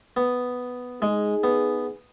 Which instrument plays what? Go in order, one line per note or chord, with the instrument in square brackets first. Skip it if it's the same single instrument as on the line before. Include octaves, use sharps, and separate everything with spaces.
[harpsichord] B3
[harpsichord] G#3 [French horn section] D#4 G#4
[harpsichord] B3